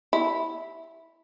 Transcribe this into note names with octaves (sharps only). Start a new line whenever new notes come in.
E4